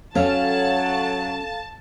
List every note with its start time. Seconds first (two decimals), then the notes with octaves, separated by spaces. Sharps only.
0.15 F#3 C#4 A4 F5 A5